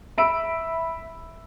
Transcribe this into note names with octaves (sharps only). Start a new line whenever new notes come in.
E5 B5 E6 D7